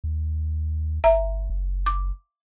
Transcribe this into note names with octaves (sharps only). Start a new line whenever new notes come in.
D#2
G1 E5 A#5
F#1
D6